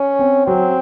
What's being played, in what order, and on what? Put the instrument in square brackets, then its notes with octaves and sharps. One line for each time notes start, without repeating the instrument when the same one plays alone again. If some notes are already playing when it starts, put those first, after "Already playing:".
Already playing: [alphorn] C#4
[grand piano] C4
[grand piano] F#3 [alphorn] C4